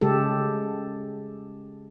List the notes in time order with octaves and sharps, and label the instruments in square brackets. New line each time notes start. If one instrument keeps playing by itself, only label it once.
[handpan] C#3 G#3 G4 A4